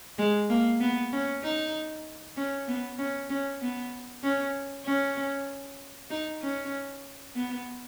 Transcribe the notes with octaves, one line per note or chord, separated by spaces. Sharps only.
G#3
A#3
B3
C#4
D#4
C#4
B3
C#4
C#4
B3
C#4
C#4
D#4
C#4
B3